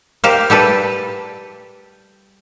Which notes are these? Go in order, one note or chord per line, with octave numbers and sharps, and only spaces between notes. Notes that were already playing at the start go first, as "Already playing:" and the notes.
G4 A#4 C5 F5
G3 G4 A4 B4